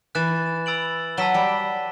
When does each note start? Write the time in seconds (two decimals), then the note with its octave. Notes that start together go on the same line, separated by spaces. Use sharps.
0.15 E3 F#6 A6 E7
0.66 B5 E6 A6 D7 F#7
1.17 F#3 A5 E6 B6 E7 G7
1.34 G3